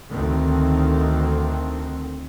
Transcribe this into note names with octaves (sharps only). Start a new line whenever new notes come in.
D2 D3 D#3 C4